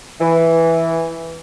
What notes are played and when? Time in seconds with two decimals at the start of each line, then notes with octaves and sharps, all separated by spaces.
0.20 E3